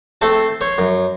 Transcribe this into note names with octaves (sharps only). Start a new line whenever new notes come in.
A3 C4 A4 C5 A5
C5 C#5
F#2